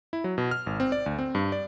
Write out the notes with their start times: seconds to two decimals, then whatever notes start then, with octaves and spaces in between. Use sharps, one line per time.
0.13 E4
0.24 F#3
0.38 B2
0.51 F6
0.66 G#1
0.80 C4
0.92 D5
1.06 D2
1.19 C4
1.35 G2
1.52 D5